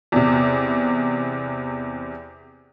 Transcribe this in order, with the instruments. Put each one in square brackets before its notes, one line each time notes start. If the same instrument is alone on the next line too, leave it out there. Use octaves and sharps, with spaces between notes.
[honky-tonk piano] E2 C3